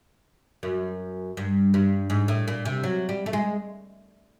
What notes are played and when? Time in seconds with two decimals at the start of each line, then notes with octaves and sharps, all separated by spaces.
0.63 F#2
1.37 G2
1.74 G2
2.10 G#2
2.28 A2
2.48 A#2
2.65 C3
2.84 F#3
3.09 G3
3.26 A3
3.33 G#3